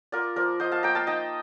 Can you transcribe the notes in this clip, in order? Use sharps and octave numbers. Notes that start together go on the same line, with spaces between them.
F4 A#4 D5
F3 A#4 D5
F3 C5 D#5
F5 A5
A#3 G5 A#5
F5 A5
D#4 D#5 G5